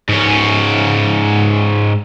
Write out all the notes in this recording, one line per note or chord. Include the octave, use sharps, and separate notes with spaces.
G#2 C#4